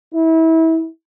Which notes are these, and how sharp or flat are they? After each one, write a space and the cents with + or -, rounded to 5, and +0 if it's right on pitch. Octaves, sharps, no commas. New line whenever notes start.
E4 -30